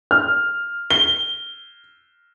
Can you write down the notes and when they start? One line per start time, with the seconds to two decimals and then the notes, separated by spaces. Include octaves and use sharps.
0.11 F6
0.90 G7